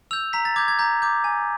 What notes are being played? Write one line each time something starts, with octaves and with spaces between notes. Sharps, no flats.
E6 G6 F7
A#5 B6
A6
D6 G6 G#6
G#6
A#5 G6
D6 G6
G#5